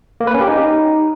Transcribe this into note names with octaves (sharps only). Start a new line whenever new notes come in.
A#3
B4
C#4
G4
D#4